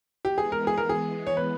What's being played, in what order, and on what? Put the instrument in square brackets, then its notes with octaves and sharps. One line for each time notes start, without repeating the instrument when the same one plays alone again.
[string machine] E3 G#3 B3 [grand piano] G4
[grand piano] G#4
A#4
G#4
A#4
G#4
C#5
B4